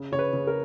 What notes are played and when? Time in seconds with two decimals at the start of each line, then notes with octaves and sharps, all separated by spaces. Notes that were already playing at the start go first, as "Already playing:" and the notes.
Already playing: C#3
0.12 C#3 C#5
0.19 B4
0.33 C#3
0.47 A#4